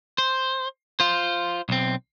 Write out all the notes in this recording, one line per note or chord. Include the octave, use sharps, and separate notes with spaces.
C5
F4 C5
B1 C4